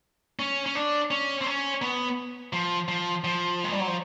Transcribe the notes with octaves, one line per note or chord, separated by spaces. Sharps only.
C#4
C#4
D4
C#4
C4
C#4
B3
F3
F3
F3
G#3
G3
F#3
F3